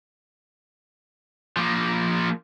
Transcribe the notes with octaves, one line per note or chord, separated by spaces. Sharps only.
F3 A#3